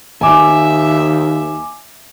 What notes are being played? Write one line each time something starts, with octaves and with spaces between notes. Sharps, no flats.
D#2 E5 G#5 D6 E6